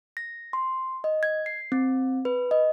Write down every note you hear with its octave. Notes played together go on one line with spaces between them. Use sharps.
A#6
C6
D#5
G#6
C7
C4
B4
D#5